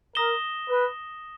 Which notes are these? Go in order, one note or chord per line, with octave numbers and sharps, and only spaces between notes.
A#4 D#6 A#6 E7 G7
B4